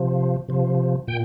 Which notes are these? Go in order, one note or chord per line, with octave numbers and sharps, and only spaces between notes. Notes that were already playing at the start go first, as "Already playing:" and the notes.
Already playing: C3 F3
C3 F3
A#2 G5